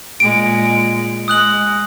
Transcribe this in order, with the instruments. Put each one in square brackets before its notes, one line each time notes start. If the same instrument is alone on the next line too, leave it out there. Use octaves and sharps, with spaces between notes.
[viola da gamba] A#2 G#3 [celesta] D7
[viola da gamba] G#3 [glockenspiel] D#6 F#6 F#7